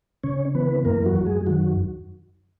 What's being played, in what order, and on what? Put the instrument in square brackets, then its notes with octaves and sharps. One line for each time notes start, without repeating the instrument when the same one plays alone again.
[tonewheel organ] C#3 C#4 C#5
E3 B3 B4
F#2 A#3 A#4
F#3 F#4
F#2
G#3 G#4
D#3 F#3 F#4